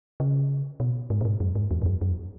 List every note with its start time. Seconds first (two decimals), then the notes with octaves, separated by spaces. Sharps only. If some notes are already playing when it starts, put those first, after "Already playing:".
0.20 C#3
0.80 B2
1.10 G#2
1.21 A#2
1.25 G#2
1.40 F#2
1.55 G#2
1.71 E2
1.82 G#2
1.86 F#2
2.01 F#2